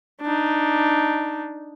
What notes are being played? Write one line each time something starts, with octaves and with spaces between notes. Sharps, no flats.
D4 D#4